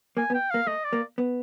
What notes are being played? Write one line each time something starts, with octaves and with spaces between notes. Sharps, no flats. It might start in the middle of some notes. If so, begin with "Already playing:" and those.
A#3 G#5
B3
G5
A#3 F5
A3 D#5
D5
A#3
B3